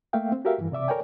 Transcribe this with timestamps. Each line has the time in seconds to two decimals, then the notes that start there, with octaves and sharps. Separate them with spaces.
0.13 A3 A#3 E5 F5 G5
0.32 C4
0.45 F#4 G4 A4 A#4 E5 F5
0.58 G2 E3
0.72 C3 D5 E5 D6
0.88 A4 A#4 C#5 D5 G5 G#5